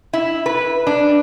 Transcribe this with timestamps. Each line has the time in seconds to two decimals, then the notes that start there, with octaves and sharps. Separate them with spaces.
0.13 E4
0.46 B4
0.87 D4